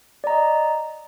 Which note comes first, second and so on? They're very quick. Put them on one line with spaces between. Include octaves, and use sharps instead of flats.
D5 A#5 D#5